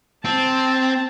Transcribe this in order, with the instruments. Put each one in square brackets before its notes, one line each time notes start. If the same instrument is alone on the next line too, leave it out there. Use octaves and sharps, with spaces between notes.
[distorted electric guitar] C4 [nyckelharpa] A5